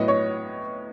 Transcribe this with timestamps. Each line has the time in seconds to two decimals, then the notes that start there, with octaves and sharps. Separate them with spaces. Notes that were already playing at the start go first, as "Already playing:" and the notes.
Already playing: A2 F#3 B3 D#5
0.08 C#5